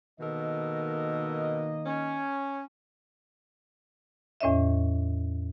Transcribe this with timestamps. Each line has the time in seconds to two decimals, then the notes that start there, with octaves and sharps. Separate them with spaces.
0.20 B2 D#3 A#3 A4 A#4 D#5
1.86 C#4
4.41 E2 A2 C#4 C#5 D#5 E5